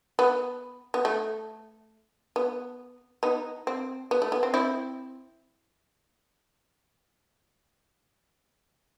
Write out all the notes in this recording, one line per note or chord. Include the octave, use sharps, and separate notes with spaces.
B3
B3
A3
B3
B3 D#4
C4
B3
A3
B3
C4
C4 E4